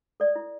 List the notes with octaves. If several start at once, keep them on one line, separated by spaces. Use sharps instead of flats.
A4 D5
E4